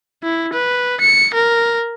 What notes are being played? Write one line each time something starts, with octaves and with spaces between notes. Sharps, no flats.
E4
B4
C#7
A#4